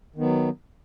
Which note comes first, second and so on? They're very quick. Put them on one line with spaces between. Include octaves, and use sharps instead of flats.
D#3 B3 F#3